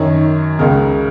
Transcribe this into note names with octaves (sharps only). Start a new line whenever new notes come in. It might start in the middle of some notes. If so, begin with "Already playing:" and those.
Already playing: F#2 D#3 C#5
C#2 C#3 A#4